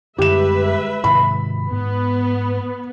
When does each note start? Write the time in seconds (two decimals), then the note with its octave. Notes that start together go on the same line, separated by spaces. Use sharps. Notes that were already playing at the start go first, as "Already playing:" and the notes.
0.18 F#2 D3 G3 G#3 G4 B4 E5 E7
1.04 G#2 C3 D#3 B5
1.71 G#2 B3